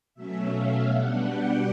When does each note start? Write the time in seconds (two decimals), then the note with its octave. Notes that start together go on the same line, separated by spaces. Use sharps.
0.14 B2 F#3 A3 C#4 E5
0.51 F5
0.87 B2 G3 B3 D4 F#5
1.23 G5